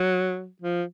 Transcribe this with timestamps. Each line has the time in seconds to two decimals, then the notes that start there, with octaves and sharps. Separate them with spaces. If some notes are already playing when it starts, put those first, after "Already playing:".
Already playing: F#3
0.62 F3